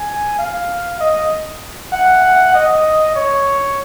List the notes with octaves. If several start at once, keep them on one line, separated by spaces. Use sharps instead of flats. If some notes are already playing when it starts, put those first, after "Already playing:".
Already playing: G#5
F5
D#5
F#5
D#5
C#5